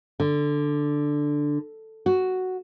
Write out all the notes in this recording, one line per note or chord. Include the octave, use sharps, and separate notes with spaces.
D3
F#4